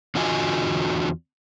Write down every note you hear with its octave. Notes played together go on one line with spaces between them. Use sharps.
E2 D3 F4 F#4 D#5 G#5